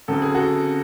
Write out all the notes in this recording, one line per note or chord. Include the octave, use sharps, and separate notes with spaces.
D2 C#3 F#3 A4
G#4
F#4 A4